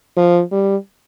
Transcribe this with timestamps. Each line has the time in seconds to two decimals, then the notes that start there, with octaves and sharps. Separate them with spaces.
0.17 F3
0.52 G3